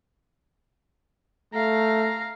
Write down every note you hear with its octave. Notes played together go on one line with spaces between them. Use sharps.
A3 F5 A#5